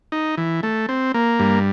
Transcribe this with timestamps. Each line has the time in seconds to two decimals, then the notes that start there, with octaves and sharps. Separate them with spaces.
0.12 D#4
0.38 E3
0.63 A3
0.89 C4
1.14 A#3
1.40 G2